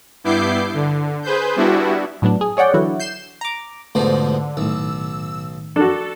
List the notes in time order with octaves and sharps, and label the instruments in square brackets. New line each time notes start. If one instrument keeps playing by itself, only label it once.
[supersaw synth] G2 B3 E4 D6 G6 C7
D3
G#4 B4 C5 G6
G3 B3 D4 E4 F#4
[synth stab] A2 F#3 B3 D4
G#4
G#4 C#5 D5 F#5 G5
D3 E3 F#3 E4 F#4
G6 C7 E7
A#5 D6
[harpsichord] G#2 B2 F3 [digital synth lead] D3 [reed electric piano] A3
[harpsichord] B1 [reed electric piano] A2 D#3 [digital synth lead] E6
[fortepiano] D4 F#4 [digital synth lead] A4